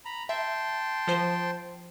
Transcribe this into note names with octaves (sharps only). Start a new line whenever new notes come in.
A#5 B5
E5 G5 A5 C6
F3 C5